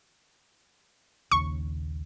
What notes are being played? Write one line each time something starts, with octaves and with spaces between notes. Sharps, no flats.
A#1 D#2 C#3 C#6